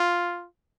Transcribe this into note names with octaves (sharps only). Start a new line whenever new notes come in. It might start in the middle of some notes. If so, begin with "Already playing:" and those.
Already playing: F4